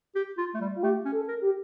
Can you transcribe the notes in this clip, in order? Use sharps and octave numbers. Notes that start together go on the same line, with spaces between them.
G4
F4
A3
G3
F4
A3 G4
C#4
A4
A#4
G4